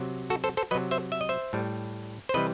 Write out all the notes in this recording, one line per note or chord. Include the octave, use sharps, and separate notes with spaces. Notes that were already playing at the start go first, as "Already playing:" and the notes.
Already playing: C3 F#3
F#4 A4
A4 C5
A4 C5
C3 F#3 B4 D#5
C5 E5
E5
D#5
C5 E5
A2 G3
C5
C3 E3 G3 B4 D#5